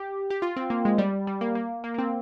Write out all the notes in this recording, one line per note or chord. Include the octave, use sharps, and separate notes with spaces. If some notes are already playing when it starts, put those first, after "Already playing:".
Already playing: G4
G4
F4
C4
A#3
G#3
G3
G3
A#3
A#3
A#3
A#3
C4